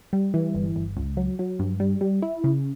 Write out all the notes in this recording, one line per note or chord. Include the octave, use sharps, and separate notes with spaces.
G3
E3
G1
G1
C#2
F#3
F#3
G2
G3
G3
E4
C#3